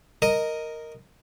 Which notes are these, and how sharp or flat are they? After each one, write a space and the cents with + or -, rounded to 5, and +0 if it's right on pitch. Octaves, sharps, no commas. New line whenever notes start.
A#4 -5 D#5 +0